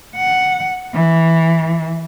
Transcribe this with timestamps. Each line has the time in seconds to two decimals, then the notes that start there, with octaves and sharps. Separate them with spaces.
0.16 F#5
0.94 E3